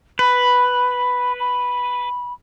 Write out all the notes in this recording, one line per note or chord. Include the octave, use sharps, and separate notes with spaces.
B4 B5
B5